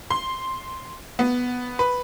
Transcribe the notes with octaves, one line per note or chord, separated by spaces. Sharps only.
C6
B3
B4